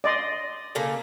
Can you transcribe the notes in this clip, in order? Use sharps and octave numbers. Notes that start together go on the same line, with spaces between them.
D5 D#5 C6
C#3 A#3 A4